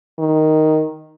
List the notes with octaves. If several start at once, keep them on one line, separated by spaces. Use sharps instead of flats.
D#3